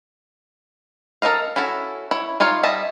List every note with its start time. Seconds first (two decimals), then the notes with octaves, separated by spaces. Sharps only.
1.22 A4 A#4 C5 D#5 F5
1.56 C#4 E4 F#4 A4
2.11 E4 C#5
2.40 D#4 F4 C#5 D5 F5
2.63 G3 D#5 E5 A5